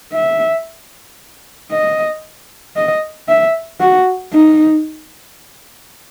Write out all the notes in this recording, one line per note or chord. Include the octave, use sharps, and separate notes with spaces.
E5
D#5
D#5
E5
F#4
D#4